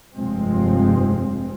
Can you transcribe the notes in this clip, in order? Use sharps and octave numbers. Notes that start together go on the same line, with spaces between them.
F1 G2 F3 G#3 C4